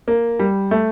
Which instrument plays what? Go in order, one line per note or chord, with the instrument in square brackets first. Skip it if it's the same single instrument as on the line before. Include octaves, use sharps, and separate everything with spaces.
[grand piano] A#3
G3
A3